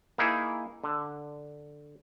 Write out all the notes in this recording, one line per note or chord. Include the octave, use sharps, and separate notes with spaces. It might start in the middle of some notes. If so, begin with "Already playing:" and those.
A#3 D#4 E4 G#4
D3